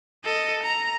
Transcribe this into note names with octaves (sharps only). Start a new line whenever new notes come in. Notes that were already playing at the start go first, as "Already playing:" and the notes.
A4 D#5
A#5